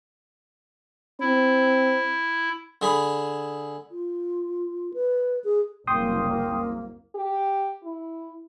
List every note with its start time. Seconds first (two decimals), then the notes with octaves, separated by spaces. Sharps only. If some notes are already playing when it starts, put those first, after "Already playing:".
1.20 C4 E4
2.82 D3 G#4 B5
3.91 F4
4.94 B4
5.44 G#4
5.87 F#1 C2 A#3 G5 C6 D#6
7.15 G4
7.84 E4